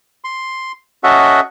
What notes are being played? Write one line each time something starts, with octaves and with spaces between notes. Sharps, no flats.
C6
C#4 F#4 A4 D#5 E5 F#5